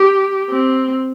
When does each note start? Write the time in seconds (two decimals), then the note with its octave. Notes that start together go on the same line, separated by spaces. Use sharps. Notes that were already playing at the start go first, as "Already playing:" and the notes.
Already playing: G4
0.50 C4